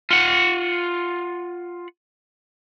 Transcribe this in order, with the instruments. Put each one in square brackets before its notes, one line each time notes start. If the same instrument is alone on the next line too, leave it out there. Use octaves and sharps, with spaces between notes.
[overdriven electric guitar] F4 F#5